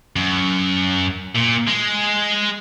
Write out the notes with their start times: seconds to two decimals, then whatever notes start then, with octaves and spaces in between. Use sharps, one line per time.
0.16 F#2
1.36 A#2
1.68 G#3